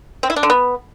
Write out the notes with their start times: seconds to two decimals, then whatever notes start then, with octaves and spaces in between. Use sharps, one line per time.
0.23 C4
0.30 E4
0.36 D4
0.43 D3
0.50 B3